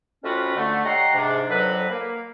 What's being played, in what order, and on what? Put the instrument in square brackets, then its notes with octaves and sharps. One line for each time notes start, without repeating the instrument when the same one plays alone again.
[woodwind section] F2 A2 C#4 F4 F#4 B4
D3 A3
G4 C#5 D#5 F#5 A#5 C6
G#2 C3 D4
F2 D3 F#3 B4
A#3